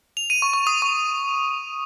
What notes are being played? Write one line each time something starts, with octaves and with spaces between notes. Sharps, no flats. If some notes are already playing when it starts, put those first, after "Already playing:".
F7
D#7
C#6
C#6
D#6
C#6